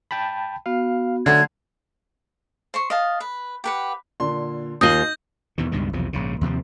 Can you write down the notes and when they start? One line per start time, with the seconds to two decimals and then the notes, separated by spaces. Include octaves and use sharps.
0.11 G5 A5 B5
0.66 B3 F#4 F5
1.26 D3 F#3 A3 G#6
2.74 C5 C6 C#6
2.90 D#5 F5 A5
3.20 B4
3.64 G4 B4 F#5
4.20 A#2 D3 C6
4.81 D#2 D#4 F4 D#6 G6 A#6 D#7 F#7
5.58 E2 B2 D#3
5.72 C#2 G2 B2 D#3
5.93 B1 E2 C3 F3
6.13 A#1 G#2 C#3
6.41 D#2 C3 F3 C4